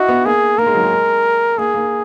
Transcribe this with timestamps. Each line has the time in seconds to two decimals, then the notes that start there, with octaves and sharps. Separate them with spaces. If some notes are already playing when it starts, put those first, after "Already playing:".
Already playing: D#4 E4 F#4
0.09 B3
0.25 A#3 G#4
0.58 A#3 A#4
0.66 G#3
0.75 F#3
0.83 G#3
1.58 A#3 G#4
1.74 A#3